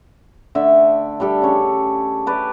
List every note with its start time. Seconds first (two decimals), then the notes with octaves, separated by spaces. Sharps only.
0.55 D3 A3 E5
1.20 G3 D4 G4 A4
1.42 C#3 C#5
2.27 G4 B4 D5